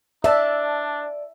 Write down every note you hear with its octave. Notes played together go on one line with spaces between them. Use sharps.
D4 D5 E5 A5